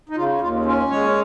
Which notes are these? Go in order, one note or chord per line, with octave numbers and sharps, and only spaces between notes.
D#4
C#3 F4
D#2 F4
C#4 F4
G#3 C#5